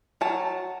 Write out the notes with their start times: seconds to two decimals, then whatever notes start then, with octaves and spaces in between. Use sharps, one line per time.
0.21 F#3 A5